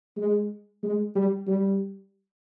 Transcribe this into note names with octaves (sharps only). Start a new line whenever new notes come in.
G#3
G#3
G3
G3